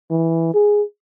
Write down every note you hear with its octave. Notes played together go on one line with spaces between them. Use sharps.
E3
G#4